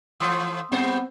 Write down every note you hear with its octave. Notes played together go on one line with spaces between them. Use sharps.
E3 F3 A3 C6 D#6 E6
A2 G3 B3 C4 C5